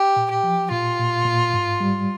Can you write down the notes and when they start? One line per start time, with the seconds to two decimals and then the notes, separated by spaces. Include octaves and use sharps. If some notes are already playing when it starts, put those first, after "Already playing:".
Already playing: G4
0.16 A#2
0.30 G4
0.43 F3
0.71 A#2 F4
0.99 A#2
1.25 A#2
1.54 G#2
1.80 G3